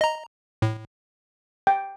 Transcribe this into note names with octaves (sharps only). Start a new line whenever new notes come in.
D#5 A#5
A2
G5